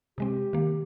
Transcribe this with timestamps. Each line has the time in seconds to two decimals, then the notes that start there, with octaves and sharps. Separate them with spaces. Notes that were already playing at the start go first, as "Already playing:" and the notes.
0.18 C3 G#3 C4 G4
0.53 D#3 A#3